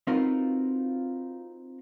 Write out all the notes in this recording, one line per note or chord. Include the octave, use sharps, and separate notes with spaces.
C4 D#4 F4 F#4 A#4 B4